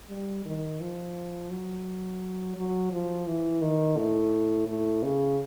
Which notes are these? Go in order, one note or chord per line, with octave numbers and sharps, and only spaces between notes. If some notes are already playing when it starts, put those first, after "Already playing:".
G3
D#3
F3
F#3
F#3
F3
E3
D#3
A2
A2
C#3